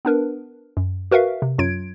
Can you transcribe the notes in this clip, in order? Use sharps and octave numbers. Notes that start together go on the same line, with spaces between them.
B3 D4 A#4 B4
F#2
F#4 A#4 B4 E5 F5
C3
F#2 F#3 F4 G#6 D7